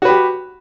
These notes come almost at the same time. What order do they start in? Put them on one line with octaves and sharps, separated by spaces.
F#4 B4 G4